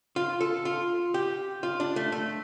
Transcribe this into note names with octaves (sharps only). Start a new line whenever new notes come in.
F4
A4
F4
G4
F4
D4
A3
A3